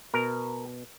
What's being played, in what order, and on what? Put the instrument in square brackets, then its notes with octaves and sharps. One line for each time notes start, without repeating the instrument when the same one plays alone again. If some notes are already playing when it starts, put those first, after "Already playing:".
[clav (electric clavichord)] B2 A#4